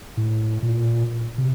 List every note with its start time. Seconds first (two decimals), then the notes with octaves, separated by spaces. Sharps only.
0.17 A2
0.62 A#2
1.38 C3